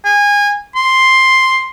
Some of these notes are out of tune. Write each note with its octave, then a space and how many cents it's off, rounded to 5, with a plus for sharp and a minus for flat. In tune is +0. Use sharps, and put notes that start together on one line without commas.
G#5 -25
C6 +5